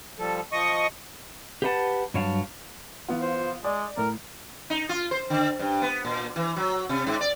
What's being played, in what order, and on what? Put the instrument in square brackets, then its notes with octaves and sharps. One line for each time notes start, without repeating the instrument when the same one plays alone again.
[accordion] F3 G3 A4
F3 D#5 C#6 D#6
[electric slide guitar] G4 G#4 B4 D#5 F#5 A5
G2 F#3 C#5 F5 A5
[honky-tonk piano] E3 B3 F4
[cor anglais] C5
[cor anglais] G#3 [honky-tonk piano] D5
[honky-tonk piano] A2 [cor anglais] A#4
[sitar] D#4
F4
C5
D3
G2
B3
A#2
E3
F#3
C3
G#2
D5